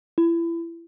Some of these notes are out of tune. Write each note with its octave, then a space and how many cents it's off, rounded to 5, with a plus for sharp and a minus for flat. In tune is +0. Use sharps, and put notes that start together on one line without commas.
E4 +30